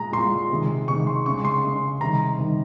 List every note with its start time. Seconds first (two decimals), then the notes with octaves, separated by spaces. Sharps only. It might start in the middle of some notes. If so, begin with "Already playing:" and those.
Already playing: A#2 G#3 A#5
0.12 A#2 G#3 C6
0.50 C3 D#3 G#3
0.88 C3 D#3 G#3 C#6
1.07 C6
1.26 C#3 G#3 C#6
1.45 C6
1.64 C#3 G#3
2.00 C3 D#3 G3 A#5
2.38 C3 D#3 G3